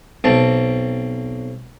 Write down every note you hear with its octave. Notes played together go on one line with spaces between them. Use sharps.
B1 C4 A5